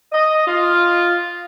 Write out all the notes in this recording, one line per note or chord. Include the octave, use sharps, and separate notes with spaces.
D#5
F4